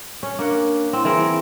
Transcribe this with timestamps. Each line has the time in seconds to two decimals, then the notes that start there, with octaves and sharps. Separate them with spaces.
0.23 C#4
0.39 A#3 D4 A#4 F#5
0.93 C4 E4
1.05 E3 C4 G#4 A#4